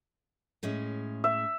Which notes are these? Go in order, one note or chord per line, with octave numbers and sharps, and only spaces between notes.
A2 G#3 C#4
E5